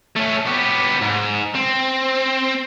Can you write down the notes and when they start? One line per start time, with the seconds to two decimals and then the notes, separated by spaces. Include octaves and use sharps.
0.16 A3 C#4
0.46 B3 G4
1.02 G#2
1.55 C4